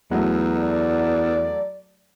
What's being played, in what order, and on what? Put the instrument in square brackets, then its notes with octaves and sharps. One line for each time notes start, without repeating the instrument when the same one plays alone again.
[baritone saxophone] E2 [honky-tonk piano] F#3 A3
[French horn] D5